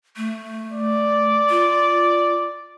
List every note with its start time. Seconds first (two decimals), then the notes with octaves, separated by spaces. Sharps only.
0.16 A3
0.72 D5
1.50 F4